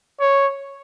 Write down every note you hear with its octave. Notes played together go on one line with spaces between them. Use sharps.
C#5